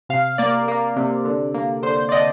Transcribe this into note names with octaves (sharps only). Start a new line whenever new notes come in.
C3 F5
A#3 D5
A#3
C3
D3
A#3
D3 C5
D5
D3 D#5